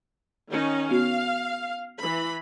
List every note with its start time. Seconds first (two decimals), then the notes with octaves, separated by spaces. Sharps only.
0.50 D#3 C#4 D#4
0.91 B3 F#4 F5
1.99 E3 B5